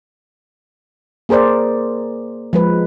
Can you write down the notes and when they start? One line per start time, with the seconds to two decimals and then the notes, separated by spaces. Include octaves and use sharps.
1.29 A#3 G#4 A#4 C5 D5
2.53 F3 G#3 B4